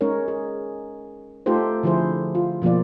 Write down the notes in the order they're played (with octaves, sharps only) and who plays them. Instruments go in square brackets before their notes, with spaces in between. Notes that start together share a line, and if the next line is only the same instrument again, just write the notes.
[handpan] G#3 C#4 D#4 A#4 C#5
G#4
A3 D#4 F4 G4 A4 C5
D3 F3 E4 G#4 C5
F4
B2 F3 A#3 F4 D5